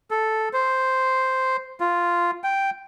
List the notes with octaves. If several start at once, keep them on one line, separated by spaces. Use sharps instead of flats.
A4
C5
F4
G5